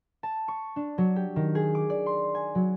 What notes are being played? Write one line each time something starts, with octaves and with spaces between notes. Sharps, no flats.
A5
C#6
D4
F#3
G4
D#3
G#4
D6
D5
C6
G#5
F#3